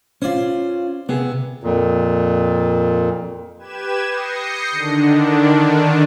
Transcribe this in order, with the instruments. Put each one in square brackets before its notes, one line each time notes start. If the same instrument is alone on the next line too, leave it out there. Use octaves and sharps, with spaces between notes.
[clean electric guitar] C#4 F4 [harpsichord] C5 D5
[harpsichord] C3 [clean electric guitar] B3 G#4
[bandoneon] F2 A#2
[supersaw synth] G4 B4 G#6 E7
D#6 G6 A#6 C7 C#7
D3 D#3 D4